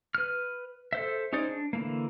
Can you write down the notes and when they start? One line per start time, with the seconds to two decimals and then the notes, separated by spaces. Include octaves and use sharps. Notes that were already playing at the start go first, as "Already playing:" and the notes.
0.15 B4 F6
0.93 A4 C5 E5
1.33 C#4 D#4 G#4 C5 D5
1.49 D4
1.73 D3 E3 A#3